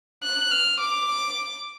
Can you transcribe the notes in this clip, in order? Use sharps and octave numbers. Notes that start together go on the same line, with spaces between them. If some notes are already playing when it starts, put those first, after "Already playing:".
F#6
F6
D6